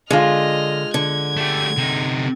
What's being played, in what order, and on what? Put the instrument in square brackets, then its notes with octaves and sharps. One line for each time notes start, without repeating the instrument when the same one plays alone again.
[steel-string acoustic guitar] D3 [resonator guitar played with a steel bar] G#3 F4 [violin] D#5 F6
[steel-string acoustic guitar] D3 [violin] G#6
[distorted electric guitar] A3 G4
C3 D#4